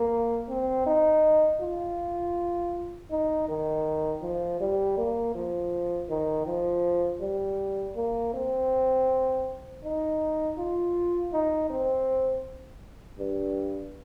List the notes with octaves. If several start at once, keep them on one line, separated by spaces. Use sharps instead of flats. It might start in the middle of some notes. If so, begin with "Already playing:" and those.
Already playing: A#3
C4
D#4
F4
D#4
D#3
F3
G3
A#3
F3
D#3
F3
G3
A#3
C4
D#4
F4
D#4
C4
G2